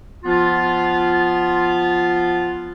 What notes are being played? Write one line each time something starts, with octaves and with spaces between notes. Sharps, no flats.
F3 B3 F4